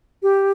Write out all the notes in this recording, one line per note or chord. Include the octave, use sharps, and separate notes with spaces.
G4